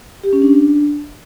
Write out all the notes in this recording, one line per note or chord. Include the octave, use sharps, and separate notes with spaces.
G4
C#4
D4